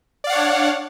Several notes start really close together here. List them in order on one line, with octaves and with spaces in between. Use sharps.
D5 F5 F#5 C#5 D4